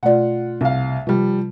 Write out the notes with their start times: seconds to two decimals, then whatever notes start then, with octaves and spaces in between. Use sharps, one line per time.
0.03 B2 A3 F4 D5 F#5
0.61 C2 F5
1.07 C3 F3 G3